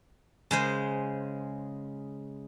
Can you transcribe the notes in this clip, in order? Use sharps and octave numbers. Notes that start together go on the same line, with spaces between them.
C#3 G#3 C5